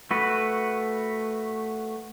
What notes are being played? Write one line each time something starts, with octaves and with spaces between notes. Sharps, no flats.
A3 F#4 B4